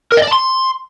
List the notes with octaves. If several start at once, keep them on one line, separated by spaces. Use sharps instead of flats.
A#4
D#5
D5
A5
C6